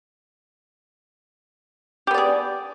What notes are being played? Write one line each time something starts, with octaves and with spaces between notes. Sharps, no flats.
B3 G4 G#4 D5